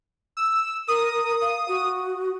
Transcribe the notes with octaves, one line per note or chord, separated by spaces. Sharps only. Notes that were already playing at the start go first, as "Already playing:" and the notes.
E6
A#4 D#6
F5
F#4